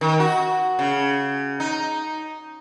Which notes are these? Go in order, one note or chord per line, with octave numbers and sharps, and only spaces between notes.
D#3
F#4
C#3
D#4